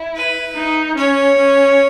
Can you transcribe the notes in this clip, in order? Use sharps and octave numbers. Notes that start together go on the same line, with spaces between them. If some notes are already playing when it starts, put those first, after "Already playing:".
Already playing: E4
B4
D#4
C#4 C#5
C#4